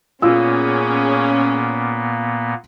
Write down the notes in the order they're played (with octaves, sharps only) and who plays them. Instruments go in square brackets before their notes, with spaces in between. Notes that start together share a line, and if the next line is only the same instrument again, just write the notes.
[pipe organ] A#2 A#3 B3 [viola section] C#4 G#4 [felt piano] F4 E6